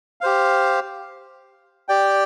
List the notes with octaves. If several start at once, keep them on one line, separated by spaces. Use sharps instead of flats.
G4 C5 F5
G4 D5 G5